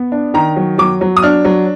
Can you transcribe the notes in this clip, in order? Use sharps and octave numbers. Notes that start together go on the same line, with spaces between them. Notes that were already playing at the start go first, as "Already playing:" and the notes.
Already playing: B3
D4
D#3 A#5
F#3
F#3 D6
F#3
D#6
D4 F6
F#3